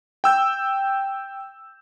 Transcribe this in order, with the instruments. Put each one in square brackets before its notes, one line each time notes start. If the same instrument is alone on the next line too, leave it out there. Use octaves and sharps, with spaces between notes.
[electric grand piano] G5 E6 G6